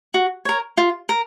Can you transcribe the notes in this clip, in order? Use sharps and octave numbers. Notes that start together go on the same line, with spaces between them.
F#4
A#4 C#5
F4
A#4